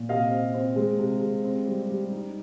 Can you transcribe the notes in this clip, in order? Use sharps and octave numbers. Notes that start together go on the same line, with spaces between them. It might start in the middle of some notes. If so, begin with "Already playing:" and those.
Already playing: A#2
C3 D#5 F5
C4
C4
G#3
C3
G#3
C4
G3
G3
D#4